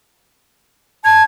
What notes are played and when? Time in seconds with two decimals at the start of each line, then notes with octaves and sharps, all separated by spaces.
1.05 A5 G#6